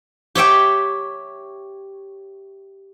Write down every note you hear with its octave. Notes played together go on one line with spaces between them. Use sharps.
G4 C#5 E5 G5